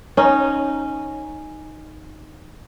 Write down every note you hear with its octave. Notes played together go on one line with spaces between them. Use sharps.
C#4 D#4